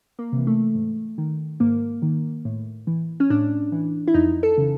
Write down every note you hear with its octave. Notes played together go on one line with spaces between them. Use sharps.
A#3
C3 E3
A3
G#2
D#3
G#2 A#3
D#3
A2
E3
C#4
A2 D4
E3
E4
F2 D#4
A4
C#3 E3